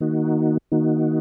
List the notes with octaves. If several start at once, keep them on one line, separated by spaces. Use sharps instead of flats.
D#3 A#3 D#4 F#4
D#3 A#3 D#4 F#4